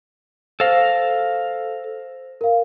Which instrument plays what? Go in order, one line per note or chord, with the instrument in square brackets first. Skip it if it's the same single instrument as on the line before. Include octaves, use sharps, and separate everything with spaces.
[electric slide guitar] A4 F5 [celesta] C5 A#6
[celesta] A#4 F5